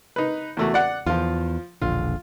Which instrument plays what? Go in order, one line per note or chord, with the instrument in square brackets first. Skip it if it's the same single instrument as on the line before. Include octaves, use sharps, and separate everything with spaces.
[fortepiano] D#4 B4
E2 A3 F#4
D5 F#5
[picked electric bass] E2 [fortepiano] F3 F4
[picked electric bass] E1 A#1 D3 [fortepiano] F4